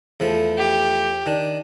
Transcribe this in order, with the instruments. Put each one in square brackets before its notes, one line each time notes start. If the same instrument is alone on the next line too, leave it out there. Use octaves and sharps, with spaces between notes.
[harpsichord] E2 F3 A3
[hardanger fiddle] G4
[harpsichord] D#3 D4